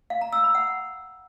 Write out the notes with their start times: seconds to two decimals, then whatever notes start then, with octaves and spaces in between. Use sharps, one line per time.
0.10 F5
0.21 A#5
0.33 E6
0.44 B5
0.55 F#5